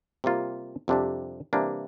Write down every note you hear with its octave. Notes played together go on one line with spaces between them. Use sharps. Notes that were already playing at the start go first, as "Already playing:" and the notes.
C3 G3 A#3 F4
F2 C3 G3 D4 G4
C3 E3 G3 A#3 D4